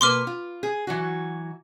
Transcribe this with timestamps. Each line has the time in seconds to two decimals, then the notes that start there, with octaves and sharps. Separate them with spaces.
0.01 B2 A#3 B4 C6 D6 F6
0.27 F4
0.63 G#4
0.87 E3 F#3 F#4